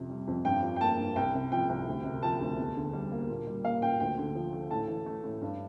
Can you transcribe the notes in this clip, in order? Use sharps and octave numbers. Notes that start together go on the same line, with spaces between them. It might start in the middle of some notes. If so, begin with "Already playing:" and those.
Already playing: F2 C3
G3
F2
G2 G5
F3
G5
A#3 A5
G2
C2 G5
C3
F3 G5
C2
D2
C3
F3 A5
D2
E2
D3
G3
A#3
A#2
G3
A#3 F5
A#2 G5
D2 G5
D3
F3
A3
A2 A5
E3
A3
A2
G2